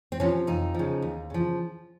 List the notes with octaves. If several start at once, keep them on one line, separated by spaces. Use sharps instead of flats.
C4
C3 F3 C#4
F2 D#4
C#3 F3
D#2
C#3 F3